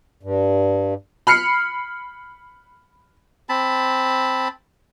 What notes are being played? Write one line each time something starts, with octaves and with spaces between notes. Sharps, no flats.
G2
B5 F6 C7 C#7
C4 A5 B5